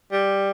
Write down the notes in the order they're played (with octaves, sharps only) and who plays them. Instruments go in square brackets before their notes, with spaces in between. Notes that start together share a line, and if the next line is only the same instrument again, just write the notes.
[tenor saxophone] G3